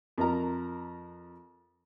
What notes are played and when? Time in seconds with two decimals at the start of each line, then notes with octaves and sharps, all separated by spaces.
0.18 F2 A#4 A#5